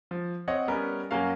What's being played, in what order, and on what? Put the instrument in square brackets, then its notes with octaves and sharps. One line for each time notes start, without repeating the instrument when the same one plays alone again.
[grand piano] F3
C4 C#5 D#5 F#5
G3 B3 C#4 A#4 C#5
F#2 A#3 C#4 F#4 F5